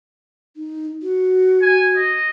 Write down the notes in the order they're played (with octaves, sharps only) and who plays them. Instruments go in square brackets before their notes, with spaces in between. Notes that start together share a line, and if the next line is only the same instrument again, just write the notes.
[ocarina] D#4
F#4
[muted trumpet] G#5
D#5